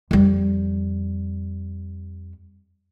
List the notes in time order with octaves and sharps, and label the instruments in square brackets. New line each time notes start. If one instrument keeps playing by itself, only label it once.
[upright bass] F2 G3